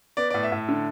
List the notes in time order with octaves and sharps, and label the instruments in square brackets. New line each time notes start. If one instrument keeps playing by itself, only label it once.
[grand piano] B3 D5
A2 D5
E5
A2
D3